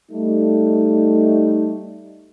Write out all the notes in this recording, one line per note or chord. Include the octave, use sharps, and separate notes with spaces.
G3 A3 D#4